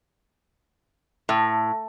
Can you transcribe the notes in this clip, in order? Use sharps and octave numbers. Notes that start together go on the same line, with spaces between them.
A2